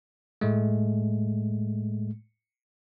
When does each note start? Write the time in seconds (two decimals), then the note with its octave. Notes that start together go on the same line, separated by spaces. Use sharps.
0.41 A2 G#3 A3